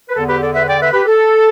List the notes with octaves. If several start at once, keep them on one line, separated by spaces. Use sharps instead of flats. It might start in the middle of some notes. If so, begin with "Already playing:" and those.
B4
E2 D3 B3 A4
G4 B4
A4 D5
B4 E5
D5 G5
B4 E5
G4 B4
A4